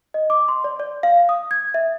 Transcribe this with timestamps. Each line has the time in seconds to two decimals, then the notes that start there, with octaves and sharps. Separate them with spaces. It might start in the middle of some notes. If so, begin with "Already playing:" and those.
0.14 D#5
0.30 D6
0.48 C6
0.64 D5
0.80 D5
1.03 F5
1.29 D#6
1.51 G#6
1.74 E5